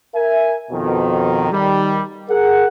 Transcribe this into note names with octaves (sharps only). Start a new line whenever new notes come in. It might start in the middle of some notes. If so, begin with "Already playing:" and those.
A#4 E5 G#5
F2 B2 D#3
D#3 G3
G#4 A#4 F#5